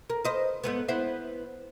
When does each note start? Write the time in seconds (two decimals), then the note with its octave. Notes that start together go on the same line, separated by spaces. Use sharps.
0.10 A#4
0.25 B4 C5 D#5
0.64 G#2 A3 B3
0.88 B3 E4 C5